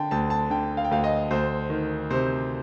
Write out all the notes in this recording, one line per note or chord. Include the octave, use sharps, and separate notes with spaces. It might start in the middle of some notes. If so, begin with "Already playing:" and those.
Already playing: D3 G5 A5
D2 A5
A5
D3 G5
F5
G5
D2 F5
D#5
D2 C5
D#3
C3 C5